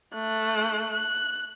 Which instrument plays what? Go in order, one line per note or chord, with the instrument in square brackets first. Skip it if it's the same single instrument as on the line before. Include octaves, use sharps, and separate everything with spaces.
[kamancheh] A3 F#6
F#6